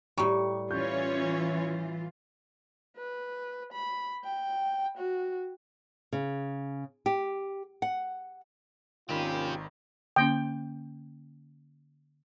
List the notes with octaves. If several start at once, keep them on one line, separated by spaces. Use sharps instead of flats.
A2 G3 G4 A#5 C#6
E3 C#4 F4 C#5 C#6 G6
B4
B5
G5
F#4
C#3
G4
F#5
G#1 D#3 A#3 C4 C#4 F4 G4 B5
D3 A#3 C#4 G5